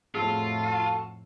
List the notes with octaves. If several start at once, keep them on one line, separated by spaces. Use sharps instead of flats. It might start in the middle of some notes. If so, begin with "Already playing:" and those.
F2 A2 F4 F#4 G#4 A4 A5